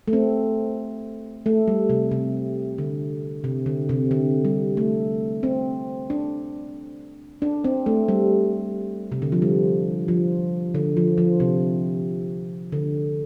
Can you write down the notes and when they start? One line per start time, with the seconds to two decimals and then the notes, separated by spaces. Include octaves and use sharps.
0.08 A3
0.13 C4
1.46 A3
1.68 G3
1.90 C3
2.11 C3
2.78 D3
3.44 C3
3.66 D3
3.89 C3
4.11 D3
4.45 G3
4.77 A3
5.43 C4
6.10 D4
7.42 D4
7.64 C4
7.86 A3
8.08 G3
9.12 C3
9.22 D3
9.32 F3
9.42 G3
10.08 F3
10.75 D3
10.97 F3
11.18 F3
11.40 C3
12.72 D3